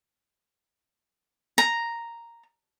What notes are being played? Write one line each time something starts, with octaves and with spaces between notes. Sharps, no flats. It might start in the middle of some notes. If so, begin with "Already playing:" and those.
A#5